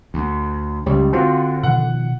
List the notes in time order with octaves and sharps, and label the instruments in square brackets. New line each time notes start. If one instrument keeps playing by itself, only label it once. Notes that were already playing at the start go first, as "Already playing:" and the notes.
[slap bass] D2
[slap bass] C#2 [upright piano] G3
[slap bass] D3 [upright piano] C4 F4 F#4
[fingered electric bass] B2 D#3 F3 [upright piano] F#5